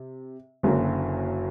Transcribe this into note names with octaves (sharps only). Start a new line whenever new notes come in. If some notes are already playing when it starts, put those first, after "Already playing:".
Already playing: C3
F#1 F#2 D3 F#3 A#3